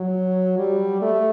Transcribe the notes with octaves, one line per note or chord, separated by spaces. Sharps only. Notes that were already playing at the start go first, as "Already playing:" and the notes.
Already playing: F#3
G3
A3